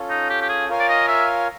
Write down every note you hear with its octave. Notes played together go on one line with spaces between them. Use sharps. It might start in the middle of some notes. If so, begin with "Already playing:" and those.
Already playing: C#4 F4 A4
D#4
G4
G4
G#4
F4 A#4 C#5 F5 G#5
D5
D#5
E5